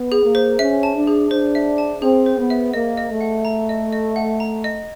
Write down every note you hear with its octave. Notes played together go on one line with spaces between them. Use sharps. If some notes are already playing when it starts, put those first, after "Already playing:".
Already playing: B3
G#4
A#3
C5
C#4 E5
A5
D4
G#4
D4 C5
E5
A5
C4 G#4
C5
B3
E5
A#3 D#5
D#5
A3
F#5
A#5
D#5
D#5
F#5
A#5
D#5